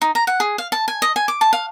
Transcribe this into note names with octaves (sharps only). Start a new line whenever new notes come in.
D#4
A#5
F#5
G#4
F5
A5
G#5
D#5
G#5
D6
A5
F5